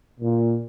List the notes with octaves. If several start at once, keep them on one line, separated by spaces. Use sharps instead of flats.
A#2